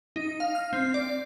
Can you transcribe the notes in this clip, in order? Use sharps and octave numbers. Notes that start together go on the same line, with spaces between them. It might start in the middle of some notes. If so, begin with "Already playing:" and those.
D#4
F5
F6
C4
D5